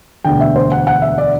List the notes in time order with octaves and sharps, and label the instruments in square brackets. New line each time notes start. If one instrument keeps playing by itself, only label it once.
[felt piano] E1 D2 D3 G5
E5
C5
F#5
F#5
E5
D5